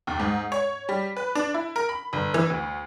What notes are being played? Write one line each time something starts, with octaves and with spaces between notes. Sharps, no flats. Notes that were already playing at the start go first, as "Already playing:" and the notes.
D#2
G#2
C#5
G3
B4
D4
E4
A#4
B5
G1
E3
D2